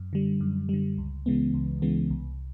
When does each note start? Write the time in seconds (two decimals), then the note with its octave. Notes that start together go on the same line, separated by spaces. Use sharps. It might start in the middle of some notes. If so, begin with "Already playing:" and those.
Already playing: F#2
0.13 D3 G3
0.41 F#2
0.69 D3 G3
0.98 C#2
1.26 C#3 E3 G#3 B3
1.54 C#2
1.82 C#3 E3 G#3 B3
2.10 C2